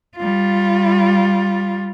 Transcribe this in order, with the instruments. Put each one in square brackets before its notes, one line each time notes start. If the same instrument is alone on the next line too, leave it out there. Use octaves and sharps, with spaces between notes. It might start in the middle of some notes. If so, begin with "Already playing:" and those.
[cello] G3 F4